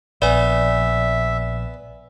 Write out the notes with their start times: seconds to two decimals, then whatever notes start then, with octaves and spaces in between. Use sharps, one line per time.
0.22 A#1 B3 D5 E5 G#5